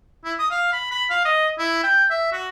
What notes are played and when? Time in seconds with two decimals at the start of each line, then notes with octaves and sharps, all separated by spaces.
0.24 E4
0.39 D#6
0.50 F5
0.73 B5
0.91 B5
1.10 F5
1.25 D#5
1.59 E4
1.83 G5
2.10 E5
2.32 F#4